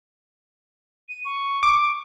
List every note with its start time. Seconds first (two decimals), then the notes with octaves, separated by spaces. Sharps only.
1.09 D#7
1.25 C#6
1.63 D6